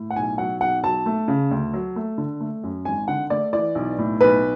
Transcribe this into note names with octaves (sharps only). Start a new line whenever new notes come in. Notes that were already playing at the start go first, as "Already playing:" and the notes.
Already playing: A2
F#5
B1 G#5
F#3 F#5
B1 F#5
F#3 A5
A3
C#3
D2
F#3
A3
D3
A3
F#2
G#1 G#5
D3 F#5
A3 D5
E3 D5
B1
A2
B1 B4